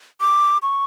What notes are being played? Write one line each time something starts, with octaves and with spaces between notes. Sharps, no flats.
D6
C#6